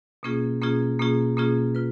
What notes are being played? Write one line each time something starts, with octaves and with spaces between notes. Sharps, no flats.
B2 A#3 C#4 F4 G#4
B2 A#3 C#4 F4 G#4
B2 A#3 C#4 F4 G#4
B2 A#3 C#4 F4 G#4
F4 B4